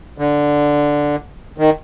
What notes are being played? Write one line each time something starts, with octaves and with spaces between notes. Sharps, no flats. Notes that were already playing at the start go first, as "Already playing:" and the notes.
D3
D#3